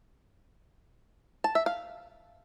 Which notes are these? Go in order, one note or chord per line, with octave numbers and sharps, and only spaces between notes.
A5
E5
F5